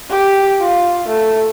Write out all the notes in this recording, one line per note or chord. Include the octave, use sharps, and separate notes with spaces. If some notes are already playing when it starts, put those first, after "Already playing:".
G4
F4
A3